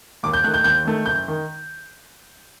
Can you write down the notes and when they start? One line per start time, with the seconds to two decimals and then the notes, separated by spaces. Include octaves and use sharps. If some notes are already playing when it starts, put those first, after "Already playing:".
0.23 D#2 D6
0.33 G6
0.44 D#3 A3 F#6
0.54 G6
0.64 D#2 G6
0.85 D#3 A3
1.06 F#1 G6
1.28 D#3